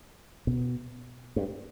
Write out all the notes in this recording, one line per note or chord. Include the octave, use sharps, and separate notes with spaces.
B2
G2